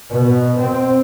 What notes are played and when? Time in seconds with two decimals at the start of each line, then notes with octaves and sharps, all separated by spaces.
0.10 B2
0.59 C4